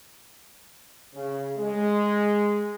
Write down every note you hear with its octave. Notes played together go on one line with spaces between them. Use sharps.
C#3
G#3